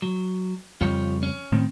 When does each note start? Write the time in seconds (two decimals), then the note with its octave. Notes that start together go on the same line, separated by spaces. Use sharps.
0.02 F#3
0.81 F2 C#3 G3 F4 G4 C#5
1.23 C#4
1.52 A2 D#3 C4